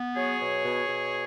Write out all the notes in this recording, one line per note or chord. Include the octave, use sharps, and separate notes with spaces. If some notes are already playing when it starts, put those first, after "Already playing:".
Already playing: B3
F#3 G#4 C#5
B2
B2
B2